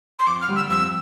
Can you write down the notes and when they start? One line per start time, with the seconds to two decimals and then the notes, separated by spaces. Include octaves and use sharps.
0.18 C6
0.26 F2 D6
0.41 F6
0.48 D3 G3 A#3
0.55 E6
0.69 F2 E6